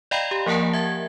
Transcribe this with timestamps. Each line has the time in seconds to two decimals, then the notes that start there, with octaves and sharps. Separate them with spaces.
0.11 D5 D#5 F5 G5 A#5 B5
0.31 G4
0.46 F3 A#3 A#4 F#5 A5
0.73 E5 G#6